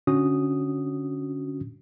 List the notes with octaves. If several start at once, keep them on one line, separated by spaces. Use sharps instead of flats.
D3 C#4 D4 F#4 D#6